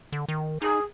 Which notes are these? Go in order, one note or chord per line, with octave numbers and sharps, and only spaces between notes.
D3
D#3
D#4 G#4